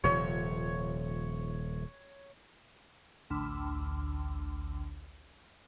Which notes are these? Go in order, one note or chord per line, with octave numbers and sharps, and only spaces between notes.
D#1 C3 F3 C#5
A1 D2